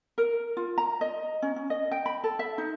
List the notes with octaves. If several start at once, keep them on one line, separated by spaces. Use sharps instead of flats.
A#4
F4
A#5
D#5
C#4
C#4
D#5
G5
B5
A4
E5
D#4